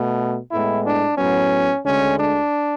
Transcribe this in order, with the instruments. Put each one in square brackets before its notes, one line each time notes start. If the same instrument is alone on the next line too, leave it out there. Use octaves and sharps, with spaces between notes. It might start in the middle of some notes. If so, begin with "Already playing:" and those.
Already playing: [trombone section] B2 A3
A2 G#3 B3 E4
D4
A2 F#3 B3 C#4
D2 D3 G#3 C#4
D4